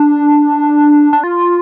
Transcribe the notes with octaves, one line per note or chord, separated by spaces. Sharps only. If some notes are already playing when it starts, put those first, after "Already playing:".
Already playing: D4
D4
F4